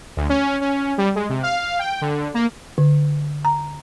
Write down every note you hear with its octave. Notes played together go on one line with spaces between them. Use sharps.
D2
C#4
C#4
G3
G#3
C3
F5
G5
D3
A#3
D3
A#5